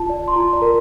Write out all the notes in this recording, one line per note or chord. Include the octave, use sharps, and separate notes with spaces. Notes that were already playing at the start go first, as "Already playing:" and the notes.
Already playing: F4 A5
D5
C6
F4 A#5
D5
A#4